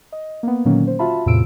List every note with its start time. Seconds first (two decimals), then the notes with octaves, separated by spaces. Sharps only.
0.12 D#5
0.43 A#3 B3
0.65 A#2 D3 D#3 F#3 A#3 C#4
0.87 C5
0.99 F4 F#4 E5 A5 B5
1.26 E2 A2 C3 F4 E6 D7